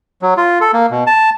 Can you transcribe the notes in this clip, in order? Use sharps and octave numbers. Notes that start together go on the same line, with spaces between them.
F#3
F4
A4
A#3
B2
A5